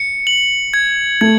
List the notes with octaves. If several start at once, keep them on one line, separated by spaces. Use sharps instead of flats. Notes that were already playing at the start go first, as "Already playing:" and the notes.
Already playing: C#7
F#7
G#6
A3 G#6